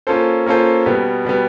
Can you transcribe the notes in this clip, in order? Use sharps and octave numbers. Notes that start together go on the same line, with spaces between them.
A#3 C#4 F4 A4 C5
A#3 C#4 F4 A4 C5
B2 G3 B3
B2 G3 B3